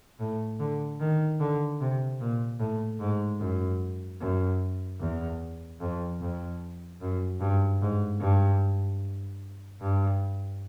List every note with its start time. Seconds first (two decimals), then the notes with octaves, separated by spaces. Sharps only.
0.20 A2
0.60 D3
1.00 D#3
1.40 D3
1.81 C3
2.20 A#2
2.60 A2
3.00 G#2
3.40 F#2
4.21 F#2
5.00 E2
5.81 F2
6.21 F2
7.01 F#2
7.41 G2
7.81 G#2
8.21 G2
9.81 G2